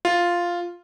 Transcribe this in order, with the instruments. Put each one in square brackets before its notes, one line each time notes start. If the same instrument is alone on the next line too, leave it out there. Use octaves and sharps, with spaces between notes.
[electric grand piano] F4